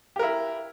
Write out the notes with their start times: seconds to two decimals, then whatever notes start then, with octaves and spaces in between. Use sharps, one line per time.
0.16 G4
0.19 A#4
0.23 E4